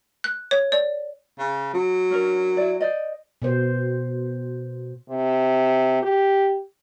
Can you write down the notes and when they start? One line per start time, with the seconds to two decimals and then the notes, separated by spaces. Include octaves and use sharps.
0.24 F#6
0.51 C#5
0.72 D5
1.39 C#3
1.74 F#3
2.11 C#4 D4 A#4
2.57 E4 D5
2.80 C5 D5 D#5
3.42 B2 C5
5.09 C3
6.02 G4